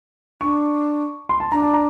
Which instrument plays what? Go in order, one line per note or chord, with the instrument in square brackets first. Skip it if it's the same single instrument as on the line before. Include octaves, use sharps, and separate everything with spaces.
[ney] D4 [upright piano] C#6
[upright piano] C6
A5
[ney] D4 [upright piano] A#5
[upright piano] A5
A#5